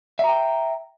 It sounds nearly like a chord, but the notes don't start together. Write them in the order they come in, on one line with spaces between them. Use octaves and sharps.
E5 A#5 G5